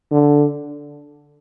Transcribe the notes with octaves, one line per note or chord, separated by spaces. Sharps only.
D3